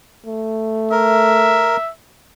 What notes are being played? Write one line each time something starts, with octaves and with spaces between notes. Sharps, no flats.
A3
A#4 E5